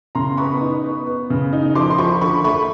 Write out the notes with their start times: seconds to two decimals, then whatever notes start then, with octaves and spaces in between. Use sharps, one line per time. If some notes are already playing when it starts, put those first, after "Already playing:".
0.15 C#3 A#5 C6
0.37 B3 B5 C#6
0.61 D#4
0.84 B3
1.06 B3
1.30 C#3
1.53 D#4
1.75 F3 C6 D6
1.90 C6
1.98 F3 B5 C#6
2.21 D3 B5 C#6
2.44 A3 B5 C#6